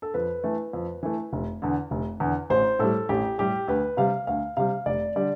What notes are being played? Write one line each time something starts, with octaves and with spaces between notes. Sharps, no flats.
A4
F2 B4
E3 A3
F2
E3 A3
F1
E2 D3
F1
E2 D3
A1 C5
A2 G3 A4
A1 G4
A2 G3 G4
D2 B4
C3 G3 F5
D2 F5
C3 G3 F5
F1 D5
D3 G3 D5